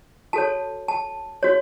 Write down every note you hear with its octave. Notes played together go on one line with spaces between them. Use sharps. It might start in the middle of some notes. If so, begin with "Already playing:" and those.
F#4 A4 C#5 A5
A5
F#4 C#5